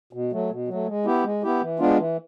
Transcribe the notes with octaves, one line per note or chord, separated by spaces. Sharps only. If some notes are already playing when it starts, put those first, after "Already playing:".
B2
F#3 A3
B2
F#3
A3
G#3
B3 E4 G4
G#3
B3 E4 G4
E3
G#3 B3 D4 F4
E3